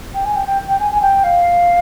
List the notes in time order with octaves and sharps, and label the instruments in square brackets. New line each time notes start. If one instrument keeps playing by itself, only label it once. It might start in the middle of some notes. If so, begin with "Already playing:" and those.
[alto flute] G5
G#5
G5
G5
G5
G#5
G#5
G5
F5